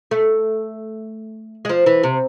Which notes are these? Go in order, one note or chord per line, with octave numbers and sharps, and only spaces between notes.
A3
G#3
F3
E3
C3